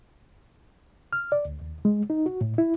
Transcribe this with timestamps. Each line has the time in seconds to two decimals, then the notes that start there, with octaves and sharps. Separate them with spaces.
1.13 F6
1.32 D5
1.45 D2
1.62 D#2
1.85 G#3
2.10 D#4
2.26 F#4
2.41 A2
2.58 E4